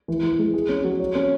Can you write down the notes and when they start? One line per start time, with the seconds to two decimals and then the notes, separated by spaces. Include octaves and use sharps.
0.08 E3
0.23 E3
0.39 G#3
0.54 G#4
0.69 C#4
0.84 F#3
1.00 C#5
1.15 C#4